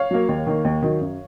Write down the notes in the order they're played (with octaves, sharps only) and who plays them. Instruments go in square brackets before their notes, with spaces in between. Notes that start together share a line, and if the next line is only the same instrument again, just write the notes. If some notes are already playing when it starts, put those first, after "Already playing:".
Already playing: [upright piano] C#5 F5
F#3 A#3
D#2
D#3 A#3
D#2
D#3 F#3
F#2